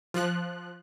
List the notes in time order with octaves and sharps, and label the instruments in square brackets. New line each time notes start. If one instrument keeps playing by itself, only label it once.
[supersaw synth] F3 F#6